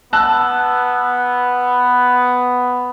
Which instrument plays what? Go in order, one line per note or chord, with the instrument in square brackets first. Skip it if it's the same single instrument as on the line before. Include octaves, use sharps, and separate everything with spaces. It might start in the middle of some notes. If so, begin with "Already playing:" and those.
[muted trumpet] B3 [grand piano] A5 E6 F#6